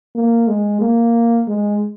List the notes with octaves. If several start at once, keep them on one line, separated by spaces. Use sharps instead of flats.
A#3
G#3
A#3
G#3